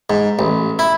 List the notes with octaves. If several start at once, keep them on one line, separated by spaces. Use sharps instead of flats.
G#2
A1
E4